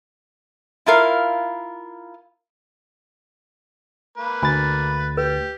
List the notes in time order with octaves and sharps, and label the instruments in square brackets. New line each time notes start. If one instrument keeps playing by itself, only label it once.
[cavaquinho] E4 F4 A#4 F5
[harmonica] A#3 B4
[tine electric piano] D2 A6 [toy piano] G#5 B5
[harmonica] G4 [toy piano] B4